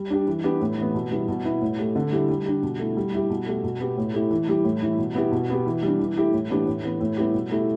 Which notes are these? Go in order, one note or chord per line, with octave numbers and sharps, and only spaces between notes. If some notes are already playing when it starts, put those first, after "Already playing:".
Already playing: G3
D4 G4
E3
B3 D4 G4
A2
E3 B3
B2
G3 B3 E4
B2
B3 E4
A2
A3 G4
D3
G3 E4 G4
G3
D4 G4
B2
A3 E4
G3
E4 G4
B2
A3 G4
B2
B3 G4
A2
A3 E4 G4
E3
G3 E4 G4
A2
E3 G3 E4
B2
B3 E4 G4
B2
B3 G4
E3
G3 D4
E3
A3 E4 G4
A2
E3 B3 D4 G4
A2
E3 B3
A2
G3 B3 E4 G4
B2
A3 E4 G4